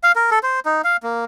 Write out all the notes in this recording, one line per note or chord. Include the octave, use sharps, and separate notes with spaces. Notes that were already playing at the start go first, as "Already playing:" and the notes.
F5
A#4
A4
C5
D#4
F5
A#3